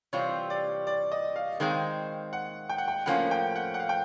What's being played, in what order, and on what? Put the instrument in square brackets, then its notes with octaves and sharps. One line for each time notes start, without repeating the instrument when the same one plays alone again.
[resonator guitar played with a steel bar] C3 E3 G3 C4 F4 [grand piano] C#5
[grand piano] D5
D5
D#5
F5
[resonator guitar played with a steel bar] D#3 G#3 C4 [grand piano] F5
[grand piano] F#5
G5
F#5
G5
[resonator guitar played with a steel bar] A2 F3 A#3 C#4 [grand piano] F#5
[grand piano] G5
F#5
F#5
F5
G5